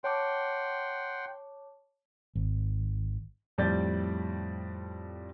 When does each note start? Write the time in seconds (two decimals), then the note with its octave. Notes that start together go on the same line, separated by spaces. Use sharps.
0.04 C#5 F#5 G5 A5 C6 D6
2.35 G#1
3.58 F2 A2 G3 D5 G6 A6